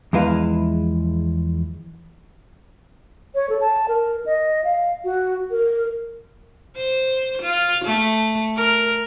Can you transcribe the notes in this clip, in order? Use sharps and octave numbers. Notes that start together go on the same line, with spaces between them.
E2 F3 G#3 E4 B4 F5
C#5
A4
A5
A#4
D#5
F5
F#4
A#4
C5
F4
A3
A#4